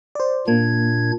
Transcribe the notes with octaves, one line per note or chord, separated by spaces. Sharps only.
C5 D5
A#2 A#3 D4 G#6